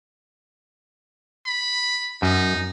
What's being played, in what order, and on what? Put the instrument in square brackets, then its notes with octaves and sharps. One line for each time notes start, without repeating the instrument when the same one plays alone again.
[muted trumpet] B5
[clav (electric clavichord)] F#2 [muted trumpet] D#4